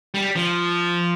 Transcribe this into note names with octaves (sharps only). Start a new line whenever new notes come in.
G3
F3